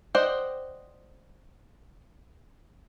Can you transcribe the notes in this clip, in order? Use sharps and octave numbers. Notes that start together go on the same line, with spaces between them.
C5 D5 D#5 F#5 G5